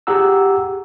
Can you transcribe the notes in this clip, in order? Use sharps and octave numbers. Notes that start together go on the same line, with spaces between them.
G4 G#4 F#5 A#5 E6